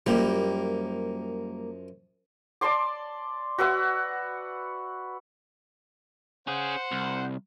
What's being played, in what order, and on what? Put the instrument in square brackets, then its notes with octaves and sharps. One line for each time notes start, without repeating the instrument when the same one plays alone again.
[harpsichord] F#2 F3 [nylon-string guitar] G3 A#3 G4
[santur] D5 A5 C6 D6
F#4 B4 E5 F#5
[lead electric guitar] C#4 G#4 [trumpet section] C5 F#5
[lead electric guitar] C2